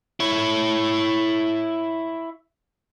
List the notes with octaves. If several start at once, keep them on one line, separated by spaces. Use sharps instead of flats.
E4 C#5